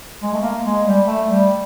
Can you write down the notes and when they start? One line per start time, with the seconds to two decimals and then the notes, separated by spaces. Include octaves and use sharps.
0.22 G#3
0.33 A3
0.42 A#3
0.64 G#3
0.86 G3
1.06 A3
1.28 G3